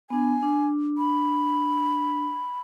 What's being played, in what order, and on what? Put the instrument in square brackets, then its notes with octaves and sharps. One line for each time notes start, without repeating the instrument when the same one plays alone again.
[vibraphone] B3 D4 [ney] G#5
[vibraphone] D4
[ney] B5